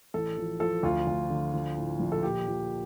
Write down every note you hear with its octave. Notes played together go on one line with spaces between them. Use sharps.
A1 A4
F3
F3 A4
D2 F4
D2
D3
F3
A2
A#1
A4
A#2 G4
F3